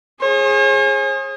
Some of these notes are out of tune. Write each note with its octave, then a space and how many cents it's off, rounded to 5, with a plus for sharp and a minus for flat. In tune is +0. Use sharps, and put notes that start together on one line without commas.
G#4 +0 C#5 -45